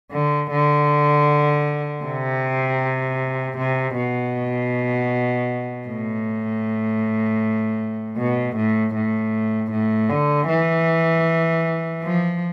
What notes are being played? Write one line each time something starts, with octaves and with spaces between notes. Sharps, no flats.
D3
D3
C3
C3
B2
A2
B2
A2
A2
A2
D3
E3
F3